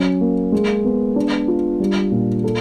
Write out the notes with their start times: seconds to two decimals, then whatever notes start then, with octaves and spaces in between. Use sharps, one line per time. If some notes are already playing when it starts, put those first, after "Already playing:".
Already playing: F#3 C#4
0.21 A#3
0.52 G#3
0.85 B3
1.16 D4
1.48 F4
1.80 G3
2.11 A#2
2.44 A4